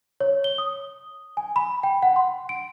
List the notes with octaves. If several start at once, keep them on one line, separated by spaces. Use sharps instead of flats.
C#5
G7
D#6
G#5
B5
G5
F#5
C6
D7